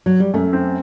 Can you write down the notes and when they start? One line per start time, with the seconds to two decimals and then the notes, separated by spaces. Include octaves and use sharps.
0.06 F#3
0.20 G3
0.34 F#2 A3
0.53 C4